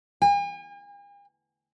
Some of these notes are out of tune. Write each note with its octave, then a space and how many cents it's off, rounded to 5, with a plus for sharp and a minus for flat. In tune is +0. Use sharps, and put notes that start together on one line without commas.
G#5 -45